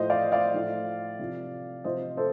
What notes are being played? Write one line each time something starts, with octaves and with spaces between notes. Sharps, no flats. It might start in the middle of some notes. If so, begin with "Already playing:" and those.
Already playing: A2 F3 C5 D#5
D5 F5
D5 F5
A2 F3
C3 F3
C3 F3 C5 D#5
A4 C5